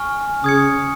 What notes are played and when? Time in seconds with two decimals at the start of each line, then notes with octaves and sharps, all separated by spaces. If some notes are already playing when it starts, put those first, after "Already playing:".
Already playing: G#5 C#6 F6
0.44 C#3 D#6 G#6 C#7